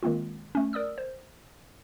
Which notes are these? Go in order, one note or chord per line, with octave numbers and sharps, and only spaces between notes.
D#3 G#3 A#3 C4 F4
A3 C#4
A#4 D5 D#6 E6
C5